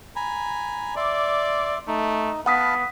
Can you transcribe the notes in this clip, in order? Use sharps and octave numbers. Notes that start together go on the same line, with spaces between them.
G#5 A#5 B5
D5 E5 C6 D6
A3 D#4
B3 F5 F#5 A5 B5 D#6 B6